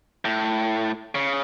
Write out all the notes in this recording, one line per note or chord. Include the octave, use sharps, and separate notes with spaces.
A2
C#3